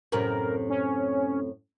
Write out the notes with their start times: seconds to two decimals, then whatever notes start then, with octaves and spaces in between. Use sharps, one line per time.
0.12 F#2 A2 C3 A#4
0.70 C#4